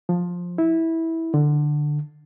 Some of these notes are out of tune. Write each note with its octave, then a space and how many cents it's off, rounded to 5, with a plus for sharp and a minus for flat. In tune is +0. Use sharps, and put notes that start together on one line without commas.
F3 +15
E4 -15
D3 +15